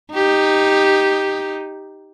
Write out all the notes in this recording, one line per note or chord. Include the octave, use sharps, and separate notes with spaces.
D#4 G4